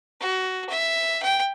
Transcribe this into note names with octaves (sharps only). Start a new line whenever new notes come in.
F#4
E5
G5